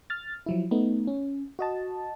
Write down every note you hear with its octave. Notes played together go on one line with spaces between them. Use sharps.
F6 A6
F3 F#3 E4
A3 B3 D#4
C#4
F#4 D#5 A5